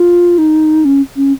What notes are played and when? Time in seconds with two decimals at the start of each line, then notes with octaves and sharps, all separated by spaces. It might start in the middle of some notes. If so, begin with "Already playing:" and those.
Already playing: F4
0.38 D#4
0.85 C#4
1.16 C#4